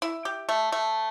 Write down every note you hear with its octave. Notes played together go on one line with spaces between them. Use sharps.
E4
G4
A3
A3